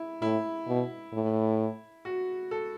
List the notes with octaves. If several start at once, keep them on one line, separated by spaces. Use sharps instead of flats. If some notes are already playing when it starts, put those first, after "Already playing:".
Already playing: E4
A2 E4
B2
A2
F#4
A4